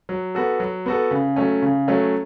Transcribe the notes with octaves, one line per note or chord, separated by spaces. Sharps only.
F#3
B3 F#4 A4
F#3
B3 F#4 A4
C#3
F#3 A3 C#4
C#3
F#3 A3 C#4